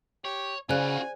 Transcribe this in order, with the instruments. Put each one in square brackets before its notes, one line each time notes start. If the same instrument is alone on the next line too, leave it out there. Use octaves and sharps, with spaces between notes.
[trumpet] G4 [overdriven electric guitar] C#5
[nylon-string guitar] C#3 [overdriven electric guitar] F4 F#4 [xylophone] C5 D5 F#6 [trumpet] G#5